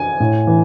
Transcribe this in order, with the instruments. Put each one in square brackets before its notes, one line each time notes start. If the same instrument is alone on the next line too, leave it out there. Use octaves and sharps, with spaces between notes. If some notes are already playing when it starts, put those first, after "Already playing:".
Already playing: [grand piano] G#5
A2
E3